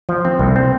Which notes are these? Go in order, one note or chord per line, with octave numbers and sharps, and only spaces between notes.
F3
C4
C2
C4